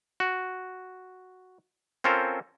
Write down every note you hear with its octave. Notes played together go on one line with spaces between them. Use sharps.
F#4
C4 C#4 F4 A4 A#4 C5